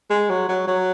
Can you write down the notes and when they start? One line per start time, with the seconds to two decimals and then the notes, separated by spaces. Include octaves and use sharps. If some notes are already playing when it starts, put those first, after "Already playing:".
0.10 G#3
0.29 F#3
0.49 F#3
0.67 F#3